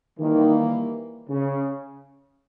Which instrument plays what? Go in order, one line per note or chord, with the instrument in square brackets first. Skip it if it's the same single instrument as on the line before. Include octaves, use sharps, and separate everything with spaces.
[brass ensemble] D#3 [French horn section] E3 G3 A#3
[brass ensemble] C#3